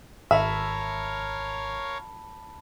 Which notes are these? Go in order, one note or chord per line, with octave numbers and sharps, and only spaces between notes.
G#1 A#4 C#5 E5 F5 A5 B5